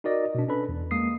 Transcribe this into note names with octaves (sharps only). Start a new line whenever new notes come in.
D#4 F#4 A#4 D5 D#5
B2 D4
C#4 D4 A4 B4 B5
E2
G#3 A#3 D#6 C7